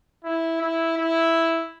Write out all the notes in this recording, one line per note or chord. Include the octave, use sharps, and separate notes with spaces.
E4
E4
E4